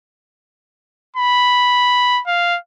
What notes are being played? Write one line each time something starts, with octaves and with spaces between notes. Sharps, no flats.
B5
F5